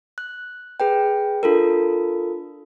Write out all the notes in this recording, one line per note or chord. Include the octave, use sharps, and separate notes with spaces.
F#6
G#4 B4 G5
D4 F4 A4 A#4